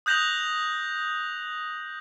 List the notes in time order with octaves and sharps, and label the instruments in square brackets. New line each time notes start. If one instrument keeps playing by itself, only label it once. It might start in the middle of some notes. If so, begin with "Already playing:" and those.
[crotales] D#6 F#6 G6 A#6 F7 F#7